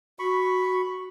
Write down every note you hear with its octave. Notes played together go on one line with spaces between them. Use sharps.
F#4 B5 C#6